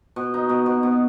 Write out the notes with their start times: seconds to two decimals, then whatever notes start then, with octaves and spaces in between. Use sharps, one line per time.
0.16 B2
0.34 D#4
0.49 B2
0.66 B2
0.83 B2